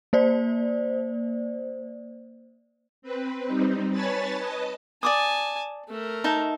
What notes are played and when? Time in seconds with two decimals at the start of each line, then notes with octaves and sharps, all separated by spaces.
0.13 A#3 C5 D5
3.02 C4 B4
3.47 G3 C4 D#4
3.92 B4 C#5 G#5 A5 B5 A6
4.35 B4 D#5 A5
5.03 D5 G#5 A5 D6 D#6
5.89 A3 A#4
6.24 D#4 E5 A5